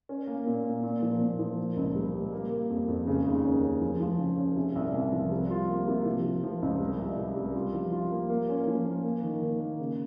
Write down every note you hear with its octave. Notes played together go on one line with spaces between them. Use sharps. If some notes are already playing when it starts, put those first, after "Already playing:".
C#4
A#3
A#2
A#3
A#2
F3
A#2
F3
A#3
C#2
G3
G3
A#3
A#3
F2
F2
C#3
D#2
C#4
C#4
F3
F3
C#3
C#4
C3
C2
C2
F3
G3
F4
A#3
C3
F3
C3
F3
C#2
G3
C2
G3
G3
F4
F3
F4
A#3
A#3
C#4
F3
A#3
A#3
D#3
D#3
A#3
C#3